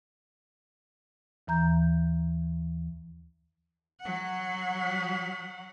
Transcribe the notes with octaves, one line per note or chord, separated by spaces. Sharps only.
D#2 E3 A#5 G6
F#3 F#5